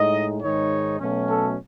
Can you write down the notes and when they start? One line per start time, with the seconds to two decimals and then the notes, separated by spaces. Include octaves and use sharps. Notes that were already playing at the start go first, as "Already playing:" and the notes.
Already playing: A2 G#3 D#4 D#5
0.43 G#2 D#3 G#3 D#4 C#5
0.99 B2 F#3 A3 C#4
1.28 A4